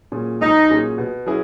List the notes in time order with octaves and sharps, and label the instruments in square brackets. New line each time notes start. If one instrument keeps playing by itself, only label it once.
[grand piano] A#2 F#3 C#4 G#4
[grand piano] B1 [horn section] D#4
[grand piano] A#2 F#3 C#4 G#4
B2
F#3 C#4 E4 G#4